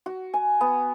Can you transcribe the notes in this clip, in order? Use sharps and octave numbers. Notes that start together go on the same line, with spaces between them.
F#4
G#5
B3